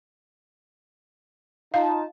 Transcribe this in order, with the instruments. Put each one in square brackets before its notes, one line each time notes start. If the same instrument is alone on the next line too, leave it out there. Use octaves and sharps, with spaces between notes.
[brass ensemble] D#4 F4 A5 [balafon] F5